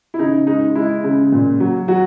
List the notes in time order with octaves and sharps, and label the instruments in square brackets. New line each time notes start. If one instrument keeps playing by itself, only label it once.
[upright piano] E4
C#3 D#4
G#3 D#4
G#3 E4
C#3
A#2
F#3
F#3 F#4